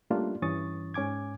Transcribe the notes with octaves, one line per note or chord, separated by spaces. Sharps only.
G3 A3 A#3 C#4 D4 F4
G2 E3 C#4 C#6 D#6 A6
G#2 C#4 G#5 D6 G#6